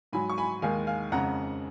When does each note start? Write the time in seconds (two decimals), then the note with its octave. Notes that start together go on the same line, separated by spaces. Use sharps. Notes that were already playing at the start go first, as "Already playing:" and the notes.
0.13 G#2 F#3 G#5 B5
0.30 C#6
0.38 G#5 B5
0.62 D#2 D#3 G#3 F5 G#5
0.87 F5 G#5
1.12 F2 C#3 G#3 F#5 A#5